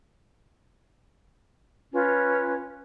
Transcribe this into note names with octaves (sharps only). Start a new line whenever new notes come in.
C#4 F4 B4